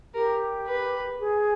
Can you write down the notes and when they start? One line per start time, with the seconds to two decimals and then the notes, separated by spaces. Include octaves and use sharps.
0.15 G4 A#4
0.67 B4
1.19 G#4